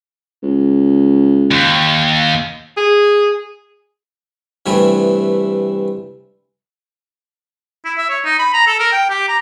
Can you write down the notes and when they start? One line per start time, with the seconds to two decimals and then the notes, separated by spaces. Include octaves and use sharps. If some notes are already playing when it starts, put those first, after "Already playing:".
0.43 C#2
1.51 D#2
2.77 G#4
4.66 G2 C3 E3 A3
7.85 E4
7.98 E5
8.09 C#5
8.25 D#4
8.39 B5
8.53 A#5
8.67 A4
8.79 A#4
8.92 G5
9.10 G4
9.28 A#5